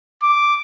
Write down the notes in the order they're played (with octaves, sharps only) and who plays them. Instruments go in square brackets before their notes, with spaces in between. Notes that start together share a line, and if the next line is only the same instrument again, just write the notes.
[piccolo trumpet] D6